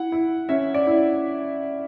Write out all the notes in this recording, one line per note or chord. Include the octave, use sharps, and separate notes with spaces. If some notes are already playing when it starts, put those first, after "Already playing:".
Already playing: E4 F#5
E4
C#4 E5
D5
E4